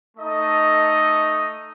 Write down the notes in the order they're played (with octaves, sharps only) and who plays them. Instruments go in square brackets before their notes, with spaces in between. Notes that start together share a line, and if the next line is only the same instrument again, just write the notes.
[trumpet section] A3 D#4 A4 D#5